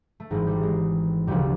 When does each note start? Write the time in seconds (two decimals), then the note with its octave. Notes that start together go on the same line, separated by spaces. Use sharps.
0.20 A3
0.30 G#1 G#2 E3 G#3
0.47 G3
0.63 G#3
1.27 E1 D2 C#3 F3 G3